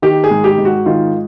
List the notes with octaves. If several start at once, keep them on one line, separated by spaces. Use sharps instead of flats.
D#3 G4
G#4
G#2
G4
G#2
F#4
D#3 F4